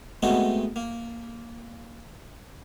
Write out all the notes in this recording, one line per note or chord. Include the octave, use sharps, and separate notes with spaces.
G#3 A3 B3 C4 D#4 F#4
A#3